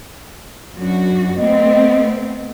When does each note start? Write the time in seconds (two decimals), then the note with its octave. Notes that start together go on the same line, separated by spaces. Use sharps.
0.76 F#2 D4 F#4
1.38 A3 B3 C4 D#5